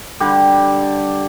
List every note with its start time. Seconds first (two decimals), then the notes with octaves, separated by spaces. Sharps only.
0.20 D3 G3 G4